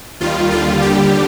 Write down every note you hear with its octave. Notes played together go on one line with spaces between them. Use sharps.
D#2 D#3 G3 F4
D#2 D3 G3 F4
D#2 D3 G3 G4